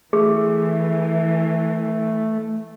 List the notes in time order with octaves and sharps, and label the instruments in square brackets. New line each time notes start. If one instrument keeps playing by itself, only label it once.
[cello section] E3 [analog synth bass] A3 [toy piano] G#4